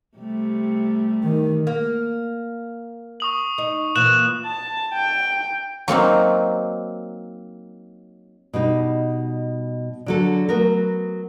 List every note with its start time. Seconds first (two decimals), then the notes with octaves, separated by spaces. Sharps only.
0.17 C3 G3 A3
1.23 D#3
1.67 A#3
3.20 C#6 D#6 F#7
3.58 D#4
3.95 A#2 E3 F#6 E7 F#7
4.45 A5
4.93 G5
5.88 F#3 A#3 C4 D#4
8.53 B2 G3 D#4
10.06 D3 F#3 A4
10.49 F#3 A3 B3 A#4